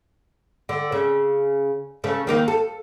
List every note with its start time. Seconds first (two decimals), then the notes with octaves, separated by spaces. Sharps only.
0.69 D3
0.92 C#3
2.04 C#3 A3
2.27 D#3 A#3 D#4
2.48 A4